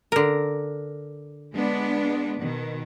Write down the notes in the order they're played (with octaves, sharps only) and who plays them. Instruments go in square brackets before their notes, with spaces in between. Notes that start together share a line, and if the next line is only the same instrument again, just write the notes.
[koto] D3 A#4
[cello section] G#3 B3 D4
B2 D#3